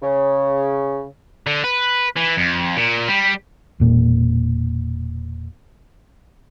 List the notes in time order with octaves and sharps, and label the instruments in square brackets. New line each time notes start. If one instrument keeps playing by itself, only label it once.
[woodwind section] C#3
[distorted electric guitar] D3
B4
E3
F2
A#2
G3
[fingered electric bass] E1 A#2